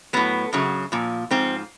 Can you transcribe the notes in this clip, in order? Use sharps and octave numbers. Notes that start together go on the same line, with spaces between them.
A2 F#3 B3
F#2 C#3 F#3
A#2 F3
G#2 F3 C4